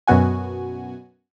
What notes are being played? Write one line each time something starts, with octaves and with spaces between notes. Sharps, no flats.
F#2 B2 B3 F#4 G#5